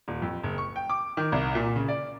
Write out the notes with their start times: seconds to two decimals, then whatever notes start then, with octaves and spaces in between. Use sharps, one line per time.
0.08 D#1
0.22 F2
0.43 F#1
0.58 C#6
0.76 G5
0.90 D6
1.17 D#3
1.32 C2
1.55 A#2
1.76 C#3
1.88 D5